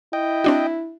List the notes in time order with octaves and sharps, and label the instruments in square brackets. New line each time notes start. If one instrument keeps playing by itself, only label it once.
[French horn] E4 [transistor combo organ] D#5 G5
[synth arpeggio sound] C4 D4 F#4